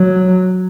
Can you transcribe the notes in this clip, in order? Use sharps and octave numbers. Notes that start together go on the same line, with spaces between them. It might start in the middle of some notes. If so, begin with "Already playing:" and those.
Already playing: F#3